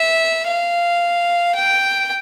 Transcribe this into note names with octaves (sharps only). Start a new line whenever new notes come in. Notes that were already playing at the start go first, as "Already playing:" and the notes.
Already playing: E5
F5
G5